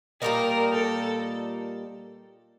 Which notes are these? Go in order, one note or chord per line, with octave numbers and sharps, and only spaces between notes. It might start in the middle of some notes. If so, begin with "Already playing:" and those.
A#2 G3 A#3 D#4 A#4
A4